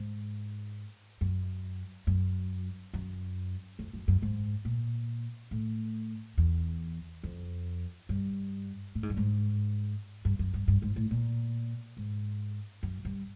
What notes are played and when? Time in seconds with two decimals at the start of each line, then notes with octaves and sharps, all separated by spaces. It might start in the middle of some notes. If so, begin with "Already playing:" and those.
Already playing: G#2
1.21 F#2
2.07 F#2
2.94 F#2
3.79 F2
3.93 F#2
4.08 F#2
4.22 G#2
4.65 A#2
5.51 A2
6.37 E2
7.23 F2
8.09 G2
8.95 A2
9.03 G#2
9.10 G2
9.17 G#2
10.25 G2
10.39 F#2
10.54 G2
10.68 G2
10.82 G#2
10.96 A2
11.11 A#2
11.97 G#2
12.83 F#2
13.05 G2